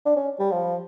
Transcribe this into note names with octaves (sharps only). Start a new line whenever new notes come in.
D4
C#4
G3
F3